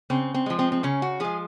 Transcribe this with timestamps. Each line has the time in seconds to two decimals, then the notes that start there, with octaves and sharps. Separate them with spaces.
0.10 C#3 C4
0.34 C4
0.46 F3 G#3
0.59 C4
0.72 C4
0.83 C#3 C#4
1.02 F#4
1.20 F3 G#3 G#4